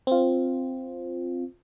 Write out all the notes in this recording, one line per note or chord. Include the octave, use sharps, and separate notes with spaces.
C4 F4